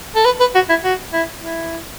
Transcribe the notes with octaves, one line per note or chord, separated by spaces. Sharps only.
A4
B4
B4
F#4
E4
F#4
E4
E4